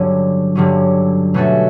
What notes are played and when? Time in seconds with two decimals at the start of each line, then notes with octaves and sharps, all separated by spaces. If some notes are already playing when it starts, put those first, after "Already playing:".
Already playing: G2 D3 F#3 C#4
0.55 G2 D3 F#3 C#4
1.34 B2 A3 C#4 F#4 A4